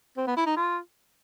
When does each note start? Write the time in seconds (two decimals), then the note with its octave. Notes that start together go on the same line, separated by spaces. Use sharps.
0.17 C4
0.27 B3
0.37 E4
0.47 D#4
0.56 F4